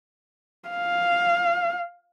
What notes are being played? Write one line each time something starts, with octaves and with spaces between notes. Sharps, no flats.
F5